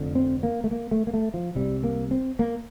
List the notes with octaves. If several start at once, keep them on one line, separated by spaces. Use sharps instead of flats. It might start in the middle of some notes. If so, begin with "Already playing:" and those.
Already playing: F1 F2 D3
C4
A#3
A3
A#3
A3
A#3
A3
F3
C2 C3 G3
A#3
C4
A#3